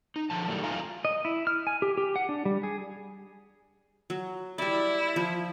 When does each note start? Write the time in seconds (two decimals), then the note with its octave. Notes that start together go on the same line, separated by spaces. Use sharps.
0.16 D#4
0.30 D3 F3 A5
0.48 A2 D#3 F#3 G3 A3
0.63 A3 D#4 F4 F5 G#5 A#5
1.05 D#5
1.25 E4
1.47 F6
1.67 G#5
1.82 G4
1.97 G4
2.16 F#5
2.29 D4
2.45 G3
2.63 G#4
4.10 F#3
4.58 G3 E4 D5
5.16 F3